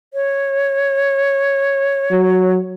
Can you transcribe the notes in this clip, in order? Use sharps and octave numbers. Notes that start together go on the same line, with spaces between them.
C#5
F#3